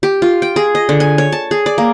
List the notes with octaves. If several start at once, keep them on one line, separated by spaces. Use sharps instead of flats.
G4
F4
G5
G#4
D#5
D3
G#5
C#5
A5
G#4
D5
A#3